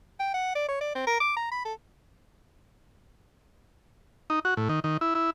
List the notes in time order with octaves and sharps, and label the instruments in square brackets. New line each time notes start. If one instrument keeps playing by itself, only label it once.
[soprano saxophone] G5
F#5
D5
C#5
D5
C4
A#4
D6
A#5
B5
A4
[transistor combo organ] D#4
F#4
A2
D#3
D#3
E4
E4